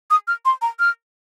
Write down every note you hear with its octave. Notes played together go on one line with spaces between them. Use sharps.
D#6
F6
C6
A#5
F6